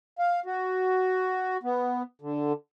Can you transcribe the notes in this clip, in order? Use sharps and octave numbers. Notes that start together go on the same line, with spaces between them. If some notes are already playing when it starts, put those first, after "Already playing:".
F5
F#4
B3
D3